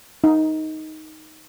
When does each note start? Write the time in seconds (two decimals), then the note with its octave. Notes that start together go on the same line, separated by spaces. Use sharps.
0.24 D#4